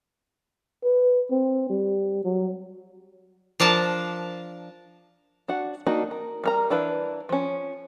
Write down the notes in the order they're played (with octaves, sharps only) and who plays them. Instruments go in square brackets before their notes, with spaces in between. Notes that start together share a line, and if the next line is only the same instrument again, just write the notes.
[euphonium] B4
C4
G3
F#3
[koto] F3 D4 A#4 A5
[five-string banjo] D4 F#4 F#5
A#3 D4 D#4 F#4
A#4
G3 A#4 A#5
E3 D4 E4 B4 F5
F3 C#4